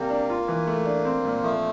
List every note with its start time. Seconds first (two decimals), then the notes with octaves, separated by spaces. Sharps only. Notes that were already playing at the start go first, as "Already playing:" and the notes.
Already playing: C3 G3 A#3 G4
0.10 D4
0.30 F4
0.48 E3
0.67 A3
0.86 D4
1.05 C4
1.25 A#2
1.43 F3 A3